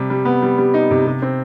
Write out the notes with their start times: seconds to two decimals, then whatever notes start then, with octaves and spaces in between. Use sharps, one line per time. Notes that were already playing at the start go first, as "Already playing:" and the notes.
Already playing: C3 G3
0.10 G3
0.25 B3
0.42 G3
0.58 G3
0.74 D#4
0.91 C3
1.06 C3
1.22 C4